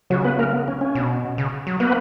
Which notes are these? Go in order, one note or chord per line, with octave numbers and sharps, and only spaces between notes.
C#3 F#3 F#4
B3 B4
A#3 A#4
B3
C#4
C#4
B2
C#3
F#3
A#3 B3 B4